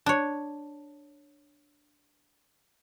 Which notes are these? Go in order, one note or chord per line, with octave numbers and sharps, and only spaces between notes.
D4 C#5